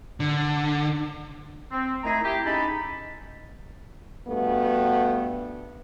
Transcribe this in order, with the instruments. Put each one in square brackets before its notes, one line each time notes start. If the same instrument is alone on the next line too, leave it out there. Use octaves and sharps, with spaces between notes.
[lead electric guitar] D3
[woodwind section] C4
D#3 A3 E4 G#4 A#5
E4 G4
G#3 C#4 D#4 A4 B5
[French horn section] G2 A3 B3 F#4